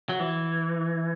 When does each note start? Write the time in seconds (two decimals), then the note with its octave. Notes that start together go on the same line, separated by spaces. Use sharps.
0.09 F#3
0.20 E3